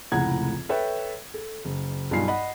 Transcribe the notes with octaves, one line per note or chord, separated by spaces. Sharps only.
F1 C#2 A2 F#5 A#5 G#6
A4 B4 C#5 E5 G5
A4
F#1
B1 G2 D#4 F4 G#5 C7
D#5 F#5 B5